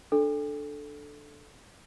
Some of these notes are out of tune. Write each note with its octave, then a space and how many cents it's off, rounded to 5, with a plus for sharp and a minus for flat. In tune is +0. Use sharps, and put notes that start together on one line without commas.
D4 +10 A4 -5